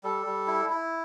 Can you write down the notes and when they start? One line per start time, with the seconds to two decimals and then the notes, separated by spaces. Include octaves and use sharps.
0.04 G3 A4
0.26 G3
0.47 E4
0.70 E4